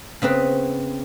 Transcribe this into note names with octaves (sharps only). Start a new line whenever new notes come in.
C#3 B3 C4 B4